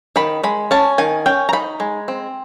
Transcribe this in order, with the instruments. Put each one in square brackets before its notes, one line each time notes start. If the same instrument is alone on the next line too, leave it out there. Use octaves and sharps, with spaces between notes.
[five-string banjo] D#3 B5
G#3 B5
C#4 A5
D#3 G#5
C#4 G5
A#5
D#4 B5
G#3
C4